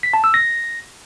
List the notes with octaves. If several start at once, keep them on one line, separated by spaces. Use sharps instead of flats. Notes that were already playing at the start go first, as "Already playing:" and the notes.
B6
A5
E6
A#6